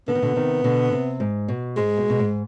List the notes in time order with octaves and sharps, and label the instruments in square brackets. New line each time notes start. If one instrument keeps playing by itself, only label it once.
[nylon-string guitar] D3 [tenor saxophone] B3
[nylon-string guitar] D#3
B2 D3
C3 D#3
B2 D3
C3
G#2
B2
[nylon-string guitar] G#2 [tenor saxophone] G#3
[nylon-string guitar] B2
B2
G#2